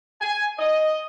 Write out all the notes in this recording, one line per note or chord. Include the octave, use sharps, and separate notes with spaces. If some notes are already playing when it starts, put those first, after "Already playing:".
G#5
D#5